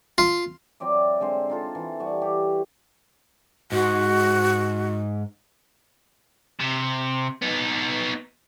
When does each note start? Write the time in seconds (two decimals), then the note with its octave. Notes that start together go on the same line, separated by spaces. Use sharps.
0.18 F4
0.80 F#3 C4 D5 E5
1.20 D3 G#3 C4 C5
1.50 D#4 F4 A4
1.75 E3
2.00 G3 F#5 C#6
2.22 G4
3.72 G#2 F#4
6.60 C3
7.42 B3 D#4